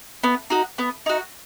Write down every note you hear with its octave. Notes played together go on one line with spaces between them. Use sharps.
B3
D#4 F#4
B3
D#4 F#4